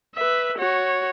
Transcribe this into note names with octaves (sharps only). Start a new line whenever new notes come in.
B4 E5
F#4 C#5